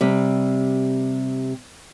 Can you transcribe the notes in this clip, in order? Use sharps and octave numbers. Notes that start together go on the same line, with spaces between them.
C3 G3